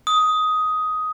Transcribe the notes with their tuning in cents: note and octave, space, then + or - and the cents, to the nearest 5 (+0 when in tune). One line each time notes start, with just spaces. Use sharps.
D#6 +10